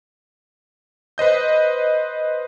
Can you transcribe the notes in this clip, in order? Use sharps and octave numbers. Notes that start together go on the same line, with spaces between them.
B4 C5 D#5 G6